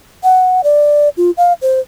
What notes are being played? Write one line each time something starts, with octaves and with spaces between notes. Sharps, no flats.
F#5
D5
F4
F5
C5